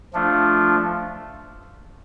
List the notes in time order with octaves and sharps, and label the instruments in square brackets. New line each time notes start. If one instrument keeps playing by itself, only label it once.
[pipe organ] F3 A3 D4 F4